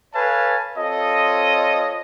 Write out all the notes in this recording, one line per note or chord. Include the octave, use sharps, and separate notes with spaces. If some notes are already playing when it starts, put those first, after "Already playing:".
A4 B4 C#5 F5 G#5 A5
C4 F4 A4 C#5 D#5